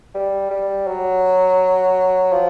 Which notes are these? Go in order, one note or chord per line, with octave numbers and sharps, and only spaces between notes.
G3
G3
F#3
F3